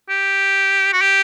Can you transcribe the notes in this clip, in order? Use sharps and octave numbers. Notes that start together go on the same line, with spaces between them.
G4
F#4
G4